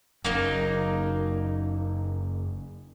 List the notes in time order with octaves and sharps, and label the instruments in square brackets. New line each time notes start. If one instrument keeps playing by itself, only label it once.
[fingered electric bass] F#1 F#2 [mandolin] A#3 D#4